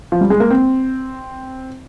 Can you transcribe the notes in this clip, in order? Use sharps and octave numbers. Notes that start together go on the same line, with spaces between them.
F3
G3
G#3
A#3
C4